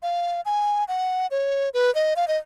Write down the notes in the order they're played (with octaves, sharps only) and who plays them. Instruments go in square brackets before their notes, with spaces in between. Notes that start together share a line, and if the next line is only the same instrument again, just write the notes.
[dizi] F5
G#5
F#5
C#5
B4
D#5
F5
D#5